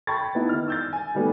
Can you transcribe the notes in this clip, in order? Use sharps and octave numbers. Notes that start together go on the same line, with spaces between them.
G5 A5 B5 C#6 G#6 A6
B3 D#4 E4
D#3 F6
E6 G6 A6
G#5
D#3 G3 A3 B3